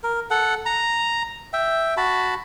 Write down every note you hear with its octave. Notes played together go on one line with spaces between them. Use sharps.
A#4
A4 F#5
A#5
E5 G5
F#4 A5 B5